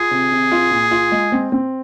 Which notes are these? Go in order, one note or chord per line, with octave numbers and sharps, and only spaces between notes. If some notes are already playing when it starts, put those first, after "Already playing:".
Already playing: F4 G#4
C3
C3
F4
A#2
F4
G#3
C4
C4